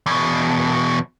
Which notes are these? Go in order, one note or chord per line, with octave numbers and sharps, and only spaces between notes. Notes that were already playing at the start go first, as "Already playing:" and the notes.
E2 B2